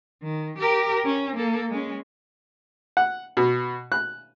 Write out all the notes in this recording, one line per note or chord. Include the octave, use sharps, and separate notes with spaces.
D#3
G4 A#4
C#4
A#3 A4
G#3 C#4
F#5
B2
F#6